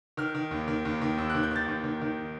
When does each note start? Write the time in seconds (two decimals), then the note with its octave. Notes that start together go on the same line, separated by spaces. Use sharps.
0.17 D#3 F6
0.35 D#3
0.51 D#2
0.68 D#3
0.85 D#2
1.02 D#3
1.17 D#2 E6
1.30 D#3 F#6
1.43 G6
1.51 D#3 A6
1.68 D#2
1.84 D#3
2.01 D#3